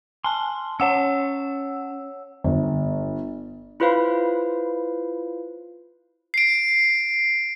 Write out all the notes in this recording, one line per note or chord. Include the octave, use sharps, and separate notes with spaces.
G#5 A5 C6
C#4 C#5 F#5 A5 E6
G1
E4 F4 B4 C5 F5 B5
C7 D7